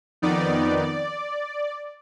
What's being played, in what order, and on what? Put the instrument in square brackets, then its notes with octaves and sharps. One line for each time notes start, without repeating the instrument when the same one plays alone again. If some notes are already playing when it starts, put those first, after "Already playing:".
[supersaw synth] F2 D#3 B3 D#4 D5